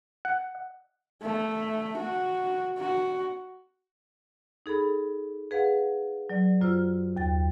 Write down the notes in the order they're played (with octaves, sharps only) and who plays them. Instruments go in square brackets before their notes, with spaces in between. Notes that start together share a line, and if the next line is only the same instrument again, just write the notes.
[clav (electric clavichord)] F#5
[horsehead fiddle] A3
F#4
F#4
[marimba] D#4 G#4 A4 B5
G#4 B4 F5 F#5
F#3 D5
F#2 F4 C5 E6 F6
D#2 G5 A6